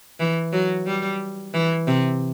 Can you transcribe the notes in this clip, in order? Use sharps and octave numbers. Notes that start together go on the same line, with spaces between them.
E3
F#3
G3
E3
C3